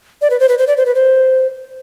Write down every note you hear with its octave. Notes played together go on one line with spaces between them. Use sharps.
D5
B4
C5
B4
C5
D5
C5
B4
C5